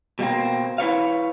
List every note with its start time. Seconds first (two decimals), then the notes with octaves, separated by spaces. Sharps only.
0.19 B2 G3 A3 A#3 C4
0.78 E4 B4 C#5 F5